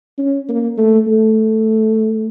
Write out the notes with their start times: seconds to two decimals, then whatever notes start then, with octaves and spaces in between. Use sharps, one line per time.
0.18 C#4
0.49 A#3
0.78 A3
1.07 A3